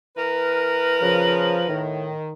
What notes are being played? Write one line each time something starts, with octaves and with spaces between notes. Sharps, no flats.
E3 A#4 B4
C#3 F3
A2 D#3